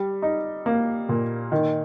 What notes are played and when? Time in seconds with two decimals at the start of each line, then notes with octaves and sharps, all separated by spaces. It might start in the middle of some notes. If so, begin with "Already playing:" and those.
Already playing: G3
0.22 D#4
0.66 A#3
1.09 A#2
1.52 D#3